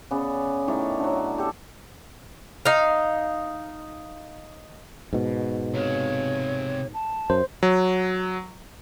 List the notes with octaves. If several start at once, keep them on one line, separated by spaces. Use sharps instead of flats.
C#3 B3 D5
A2 D#3 C#5 D5
D3 F#3
G4 A4
D#4 F5
G#2 B2
C3 C#5 F5
A5
F#2 C5
F#3